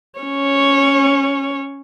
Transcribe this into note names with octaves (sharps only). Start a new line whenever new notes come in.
C#4 C#5